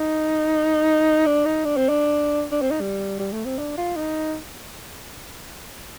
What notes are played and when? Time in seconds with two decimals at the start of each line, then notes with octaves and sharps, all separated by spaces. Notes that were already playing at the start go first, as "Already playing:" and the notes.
Already playing: D#4
1.26 D4
1.45 D#4
1.65 D4
1.77 C4
1.89 D4
2.52 D4
2.62 C4
2.71 D#4
2.81 G3
3.20 G3
3.32 A3
3.45 C4
3.58 D4
3.77 F4
3.96 D#4